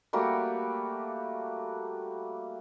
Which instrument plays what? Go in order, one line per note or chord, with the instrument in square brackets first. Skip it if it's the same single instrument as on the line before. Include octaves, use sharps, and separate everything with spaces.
[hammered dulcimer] G3 A3 A#3 F#4